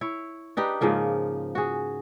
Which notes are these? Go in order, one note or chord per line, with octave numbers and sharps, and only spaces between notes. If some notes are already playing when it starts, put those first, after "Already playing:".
E4 C#5
D4 D#4 G4 B4
G#2 C#3 F3 A#3
F#4 G#4